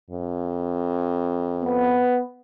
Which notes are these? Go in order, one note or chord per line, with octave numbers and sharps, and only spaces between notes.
F2
B3